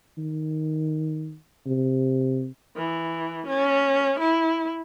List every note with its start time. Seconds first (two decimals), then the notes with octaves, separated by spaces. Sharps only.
0.18 D#3
1.66 C3
2.76 E3
3.47 C#4
4.19 E4